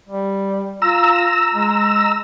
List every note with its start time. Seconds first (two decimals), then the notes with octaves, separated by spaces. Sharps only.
0.09 G3
0.82 F4 A#5 E6
1.53 G#3